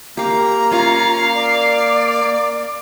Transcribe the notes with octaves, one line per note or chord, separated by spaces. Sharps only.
A#3 G4 F5 A#5
C#4 F4 C#5 F5
D5